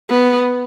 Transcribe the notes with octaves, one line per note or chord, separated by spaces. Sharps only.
B3